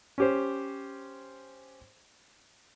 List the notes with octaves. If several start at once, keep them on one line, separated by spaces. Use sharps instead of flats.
C#4 G4 C5